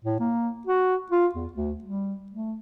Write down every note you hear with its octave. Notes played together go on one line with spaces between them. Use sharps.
A2
A#3
F#4
F4
E2
D2
G3
A3